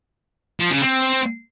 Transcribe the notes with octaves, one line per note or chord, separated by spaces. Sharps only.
F3
C#3
C4